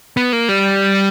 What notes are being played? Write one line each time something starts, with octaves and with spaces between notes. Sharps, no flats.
B3
A#3
G3